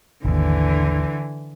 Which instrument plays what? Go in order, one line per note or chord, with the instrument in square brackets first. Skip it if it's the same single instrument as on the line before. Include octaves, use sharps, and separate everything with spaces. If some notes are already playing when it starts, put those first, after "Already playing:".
[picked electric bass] G#1 D#2 [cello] D3 E3